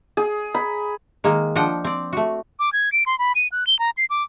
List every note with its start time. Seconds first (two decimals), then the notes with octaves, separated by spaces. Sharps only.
0.17 G#4
0.55 B5
1.24 D#3 G#3 A#3
1.56 F3 D4 D#5 F#5 G5
1.84 C4 D5
2.13 A3 F#4
2.59 D6
2.73 G#6
2.92 D7
3.06 C6
3.19 B5
3.35 D#7
3.52 F#6
3.67 G7
3.79 A#5
3.97 C7
4.10 D6